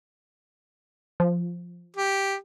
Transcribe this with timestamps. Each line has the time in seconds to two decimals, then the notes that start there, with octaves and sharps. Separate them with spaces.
1.20 F3
1.97 G4